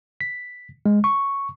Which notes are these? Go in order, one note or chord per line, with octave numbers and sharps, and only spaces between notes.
B6
G#3
C#6